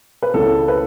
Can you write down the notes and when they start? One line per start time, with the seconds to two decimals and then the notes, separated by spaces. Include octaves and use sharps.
0.22 B4
0.34 C#2 C#3 E3 A4
0.68 B4